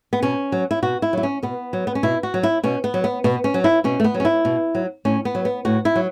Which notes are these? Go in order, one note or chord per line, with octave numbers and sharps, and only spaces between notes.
B3
B2 C#4
F#3
E4
B2 F#4
E4
F#3 E4
C#4
B2 B3
F#3
B3
C#4
B2 E4
F#4
F#3
E4
B2 C#4
B3
F#3
B3
B2 B3
C#4
F#3
E4
B2 C#4
A3
B3
F#3
C#4
E4
B2
F#3
A2 C#4
B3
F#3
B3
A2 F#4
E4
F#3